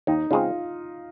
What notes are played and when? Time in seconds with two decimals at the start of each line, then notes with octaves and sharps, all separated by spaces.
0.07 D#2 D#4
0.31 C#3 G#3 C4 F4